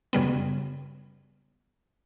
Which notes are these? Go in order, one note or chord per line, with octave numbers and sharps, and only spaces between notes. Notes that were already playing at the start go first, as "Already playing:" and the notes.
F#2 C#3 G3 B3